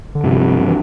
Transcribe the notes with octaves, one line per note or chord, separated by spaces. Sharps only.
D3
G2 C3 F3 C4
E3